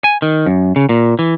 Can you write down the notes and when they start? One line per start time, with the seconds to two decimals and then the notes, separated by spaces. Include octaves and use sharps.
0.04 G#5
0.22 D#3
0.46 F#2
0.76 C#3
0.89 A#2
1.19 E3